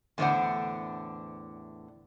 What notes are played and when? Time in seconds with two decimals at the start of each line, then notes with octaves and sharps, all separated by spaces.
0.18 E2 A2 D3 D4 C5 F#5